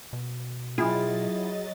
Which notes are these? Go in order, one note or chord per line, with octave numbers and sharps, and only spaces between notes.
B2
F#3 E4 F4 G#4 D#5 G5 A6